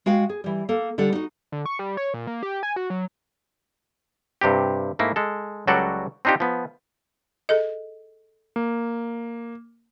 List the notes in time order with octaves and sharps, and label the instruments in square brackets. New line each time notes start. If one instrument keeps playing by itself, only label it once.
[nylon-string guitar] G#3 F#4 F5 G5
G#4
E3 G3
A#3 A4
D3 G3 A4 F#5
D#4 F#4
[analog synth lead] D3
C#6
G3
C#5
A#2
A#3
G4
G#5
F#4
F#3
[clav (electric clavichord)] G2 C3 C4 G4
G#2 A3 A#3 E4
G#3 A4
C#2 F#3 G3 F#4 A4 D5
C4 D4 D#4 F4 G4
F3 B3
[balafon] G#4 A4 D#5
[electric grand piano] A#3